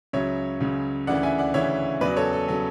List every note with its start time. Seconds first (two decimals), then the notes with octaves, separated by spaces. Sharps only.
0.13 C#2 C#3 F#3 C#5 E5
0.60 C#2 C#3 F#3
1.07 D2 C#3 E3 D5 F#5
1.23 E5 G#5
1.38 D5 F#5
1.54 D2 C#3 E3 C#5 E5
2.01 E2 C#3 F#3 B4 D5
2.16 A4 C#5
2.33 A4
2.48 C#3 F#3 A4